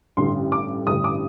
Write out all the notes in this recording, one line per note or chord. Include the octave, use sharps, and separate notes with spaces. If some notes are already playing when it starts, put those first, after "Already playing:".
A1 G2 D3 C6
D6
A1 G2 D3 D#6
D6